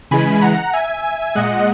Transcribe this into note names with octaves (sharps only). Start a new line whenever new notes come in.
C#3 E3 G#3 G#5 B5
F#5 A#5
E5 G#5
A#2 G#3 D#5 F#5